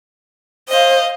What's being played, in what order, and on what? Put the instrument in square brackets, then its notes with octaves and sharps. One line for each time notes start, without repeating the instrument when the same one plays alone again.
[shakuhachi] C5 [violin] D#5 F5